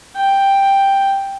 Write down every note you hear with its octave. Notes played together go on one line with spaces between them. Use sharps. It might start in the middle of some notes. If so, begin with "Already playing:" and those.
G5